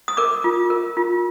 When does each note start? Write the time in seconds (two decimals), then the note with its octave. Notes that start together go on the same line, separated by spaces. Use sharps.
0.08 D#6
0.17 A#4 D6
0.44 F4
0.70 A#4
0.97 F4